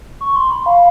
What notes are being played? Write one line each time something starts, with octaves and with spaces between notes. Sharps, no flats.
C#6
C6
B5
F5